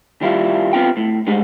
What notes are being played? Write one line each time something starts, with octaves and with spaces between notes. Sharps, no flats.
D#3 G3 E4 F4
B3 C4 F4 G5
A2
G3 G#3 D#4